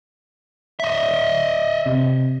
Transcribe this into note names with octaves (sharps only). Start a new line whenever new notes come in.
D#5 E5
C3